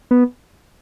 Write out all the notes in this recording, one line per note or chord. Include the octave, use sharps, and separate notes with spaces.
B3